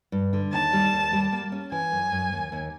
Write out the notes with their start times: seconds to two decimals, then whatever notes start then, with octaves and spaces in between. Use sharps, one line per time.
0.12 G2
0.33 D3
0.53 D#2 A5
0.73 G3
0.93 D#2
1.13 G3
1.32 A#3
1.52 C#4
1.72 E3 G#5
1.92 F#2
2.12 F#2
2.32 D#2
2.52 D#2